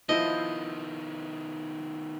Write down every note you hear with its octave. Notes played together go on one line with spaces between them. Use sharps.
D#3 F3 B3 E4 C5 D#5